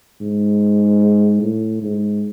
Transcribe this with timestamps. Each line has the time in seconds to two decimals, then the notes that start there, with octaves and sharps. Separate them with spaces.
0.22 G#2
1.42 A2
1.82 G#2